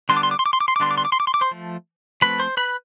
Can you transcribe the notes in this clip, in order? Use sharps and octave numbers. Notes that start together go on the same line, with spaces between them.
D3 G3 B3 D4 C6
D6
C6
D6
C6
D6
C6
D6
C6
D6
D3 G3 B3 D4 C6
D6
C6
D6
C6
D6
C6
D6
C5 C6
F3 A3
F3 A3 C4 B4 B5
C5 C6
B4 B5